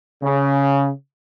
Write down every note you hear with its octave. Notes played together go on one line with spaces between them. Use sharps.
C#3